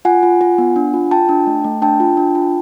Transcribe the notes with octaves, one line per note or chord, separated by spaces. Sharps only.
F4 F#5 G#5
F4
F4
B3
D4
F4
F4 G5 A5
D4
A3
A3
D4 G5 A5
F4
D4
F4